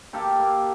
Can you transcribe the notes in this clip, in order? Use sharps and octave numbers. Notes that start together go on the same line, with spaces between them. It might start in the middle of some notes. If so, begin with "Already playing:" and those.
A#3 G4 A4
A#3